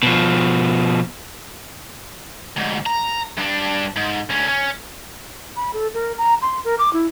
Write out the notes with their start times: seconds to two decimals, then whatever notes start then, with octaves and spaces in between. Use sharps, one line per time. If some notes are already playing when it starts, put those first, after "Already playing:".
0.03 B2 F3
2.57 D2 G#2
2.86 A#5
3.37 G2 D4
3.96 G#2
4.30 D2 C#4
4.48 C#4
5.56 B5
5.73 A4
5.94 A#4
6.18 A#5
6.42 C6
6.64 A#4
6.79 D6
6.93 E4